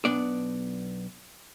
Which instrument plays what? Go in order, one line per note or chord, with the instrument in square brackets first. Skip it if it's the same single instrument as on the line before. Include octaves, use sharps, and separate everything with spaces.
[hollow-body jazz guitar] B1 B3 D4 D5